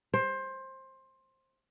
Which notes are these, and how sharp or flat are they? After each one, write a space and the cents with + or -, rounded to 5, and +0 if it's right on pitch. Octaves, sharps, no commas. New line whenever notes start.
C5 +20